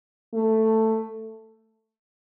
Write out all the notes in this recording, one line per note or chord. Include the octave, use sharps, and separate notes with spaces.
A3